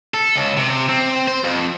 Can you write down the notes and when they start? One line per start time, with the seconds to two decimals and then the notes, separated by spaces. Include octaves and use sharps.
0.14 A4
0.36 C#2
0.57 C3
0.89 C4
1.28 C5
1.44 F2